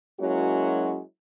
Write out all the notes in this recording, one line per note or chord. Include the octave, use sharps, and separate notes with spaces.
F#3 G#3 A#3 C#4 E4 F#4